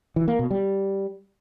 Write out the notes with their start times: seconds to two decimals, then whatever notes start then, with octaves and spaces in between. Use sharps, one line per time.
0.16 E3
0.28 A#3
0.39 B2
0.51 G3